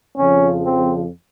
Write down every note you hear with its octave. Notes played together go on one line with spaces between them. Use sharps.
F2 C#3 F3 C#4
C4